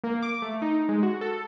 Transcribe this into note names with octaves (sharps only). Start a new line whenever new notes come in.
A#3
D6
A3
D#4
G#3
F#4
A4